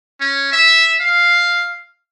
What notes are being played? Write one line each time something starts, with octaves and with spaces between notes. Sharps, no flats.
C#4
E5
F5